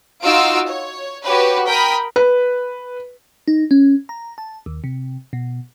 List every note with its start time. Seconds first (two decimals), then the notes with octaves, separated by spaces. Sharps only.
0.23 D#4 F4 F#4 F5 E6 D7
0.68 C#5
1.25 F#4 G4 B4 C#5
1.68 A#4 G5 B5 D#6 B6
2.16 B4
3.48 D#4
3.71 C#4
4.09 A#5
4.38 A5
4.66 D#2
4.84 C3
5.33 B2